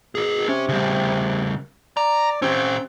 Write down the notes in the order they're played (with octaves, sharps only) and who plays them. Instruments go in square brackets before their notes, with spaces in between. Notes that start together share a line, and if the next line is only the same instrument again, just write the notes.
[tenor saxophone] B2 [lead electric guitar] G#4 A#4
[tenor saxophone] C3 [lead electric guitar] C#4
[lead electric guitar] C#3 G3
[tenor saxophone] D5 [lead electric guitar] A#5
[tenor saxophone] C4 [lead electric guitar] C#4 G4